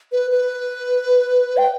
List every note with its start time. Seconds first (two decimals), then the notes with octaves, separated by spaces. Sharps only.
0.12 B4
0.31 B4
1.57 G5